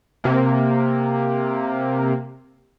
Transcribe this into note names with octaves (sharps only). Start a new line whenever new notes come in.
C3 A#3